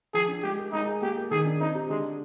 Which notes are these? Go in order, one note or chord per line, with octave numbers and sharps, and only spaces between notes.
F3 G#4
D4
G#3 G4
A#4
G#3 D#4
G#4
A#3 G4
A#4
D#3 G#4
D4
C4 D#4
G4
D3 G#3